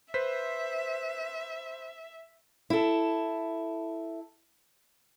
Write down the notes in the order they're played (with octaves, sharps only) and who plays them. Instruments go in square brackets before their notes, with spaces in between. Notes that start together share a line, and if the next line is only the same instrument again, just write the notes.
[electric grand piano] B4 C5 B6 [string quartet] E5
[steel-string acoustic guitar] E4 A4